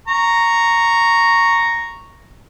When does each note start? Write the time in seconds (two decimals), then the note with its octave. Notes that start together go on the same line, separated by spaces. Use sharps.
0.08 A#5 C#6